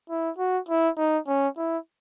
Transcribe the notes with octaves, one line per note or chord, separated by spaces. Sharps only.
E4
F#4
E4
D#4
C#4
E4